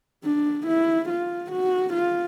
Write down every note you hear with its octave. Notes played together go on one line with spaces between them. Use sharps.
D4
E4
F4
F#4
F4